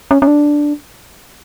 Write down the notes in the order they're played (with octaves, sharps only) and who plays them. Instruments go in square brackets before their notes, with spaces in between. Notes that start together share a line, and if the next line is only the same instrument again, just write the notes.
[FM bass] C#4
C#4
D4